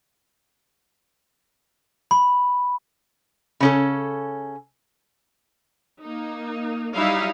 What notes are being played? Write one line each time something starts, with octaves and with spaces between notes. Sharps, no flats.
B5
C#3 C#4 A4
A#3 D#4
F#3 G3 D#4 E4 F5